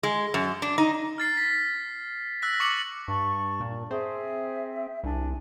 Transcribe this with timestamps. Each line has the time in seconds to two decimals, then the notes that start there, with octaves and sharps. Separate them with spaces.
0.03 G#3
0.34 F#2
0.62 D4
0.78 D#4
1.18 F6 A6 C7
1.37 B6
2.42 E6 F#6 A#6 B6
2.60 C#6 D6 C#7 F#7
3.08 G2 A5 C#6
3.60 A#2
3.91 C4 G#4 E5
5.04 C2 D4 G#5